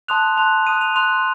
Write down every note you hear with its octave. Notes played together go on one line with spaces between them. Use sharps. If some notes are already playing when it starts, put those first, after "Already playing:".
A5 C6 D#6 F#6 F7
A5 C6 F#6 F7
A5 D#6 F#6 D#7
F7
C6 D#6 F#6 F7